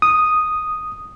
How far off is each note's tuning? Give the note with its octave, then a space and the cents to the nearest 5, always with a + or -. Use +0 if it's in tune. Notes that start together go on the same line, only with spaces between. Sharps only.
D#6 +0